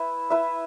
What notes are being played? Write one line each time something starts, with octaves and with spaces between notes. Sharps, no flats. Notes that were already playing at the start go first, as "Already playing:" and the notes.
Already playing: E4 B4 E5
E4 B4 E5